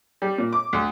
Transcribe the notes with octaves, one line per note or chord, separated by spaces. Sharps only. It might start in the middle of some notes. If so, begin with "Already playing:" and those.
G3
A#2
D6
D2